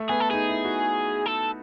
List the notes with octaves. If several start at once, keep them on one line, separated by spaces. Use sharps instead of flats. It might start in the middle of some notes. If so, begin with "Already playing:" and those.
Already playing: A3
B3 G#4
A4
D#4 G#4
E4
F#4
A4